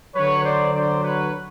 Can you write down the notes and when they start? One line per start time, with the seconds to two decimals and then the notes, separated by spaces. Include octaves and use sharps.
0.15 D3 F#3 B4 C#5
0.44 C5 D5
0.74 C5 D5
1.03 B4 C#5